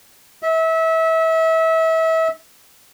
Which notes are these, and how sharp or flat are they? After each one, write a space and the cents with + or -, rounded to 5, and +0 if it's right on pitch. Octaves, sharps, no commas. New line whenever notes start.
E5 -30